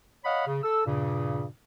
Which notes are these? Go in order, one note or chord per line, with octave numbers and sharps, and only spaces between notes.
C#5 D#5 F5 F#5 B5
C#3
A4 E6
G2 A#2 C#3